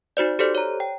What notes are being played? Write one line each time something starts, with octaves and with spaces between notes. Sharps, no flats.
D#4 F#4 C5 D5
G4 A4 C5 D5
C#5 A#5
G5